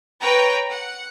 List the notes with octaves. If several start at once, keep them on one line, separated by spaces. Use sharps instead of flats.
B4 C#5 G5 A#5
F#5